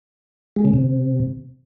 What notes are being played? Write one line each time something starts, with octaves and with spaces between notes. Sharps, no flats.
G#3
C#3
C3